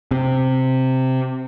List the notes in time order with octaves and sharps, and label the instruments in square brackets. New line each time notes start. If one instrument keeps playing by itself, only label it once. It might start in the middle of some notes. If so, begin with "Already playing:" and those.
[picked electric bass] C3